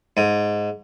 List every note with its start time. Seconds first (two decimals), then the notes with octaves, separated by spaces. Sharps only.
0.17 G#2